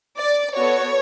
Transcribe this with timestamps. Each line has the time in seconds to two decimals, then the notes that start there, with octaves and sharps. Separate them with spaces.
0.18 D5
0.56 B3 F#4 A4 C#5